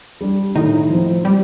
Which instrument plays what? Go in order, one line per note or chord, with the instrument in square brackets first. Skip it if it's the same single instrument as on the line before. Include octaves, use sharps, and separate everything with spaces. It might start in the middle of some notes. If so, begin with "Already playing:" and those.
[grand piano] G3 D4
[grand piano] A2 [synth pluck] D#3 D#4
[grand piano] F3 C4
[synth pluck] G3 G4